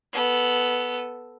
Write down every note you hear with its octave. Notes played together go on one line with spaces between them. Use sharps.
B3 A4